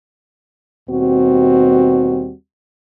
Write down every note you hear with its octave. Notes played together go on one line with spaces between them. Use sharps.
D#2 B2 G3 C4 F#4